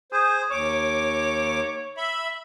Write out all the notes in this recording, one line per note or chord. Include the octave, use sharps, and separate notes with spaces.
G#4 C5
D#2 C#5 D6
E5 B5